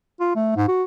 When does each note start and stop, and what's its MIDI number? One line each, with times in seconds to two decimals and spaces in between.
0.20 0.31 65
0.36 0.55 57
0.56 0.65 44
0.68 0.83 66